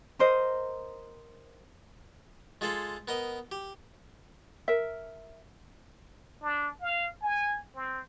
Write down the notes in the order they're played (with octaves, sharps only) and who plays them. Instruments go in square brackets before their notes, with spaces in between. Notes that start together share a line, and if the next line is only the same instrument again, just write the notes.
[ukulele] A#4 C5 D#5
[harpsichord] G#3 F4 G#4 A4
B3 A#4 D#5
G4
[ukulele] A#4 E5
[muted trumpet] D4
F5
G#5
C4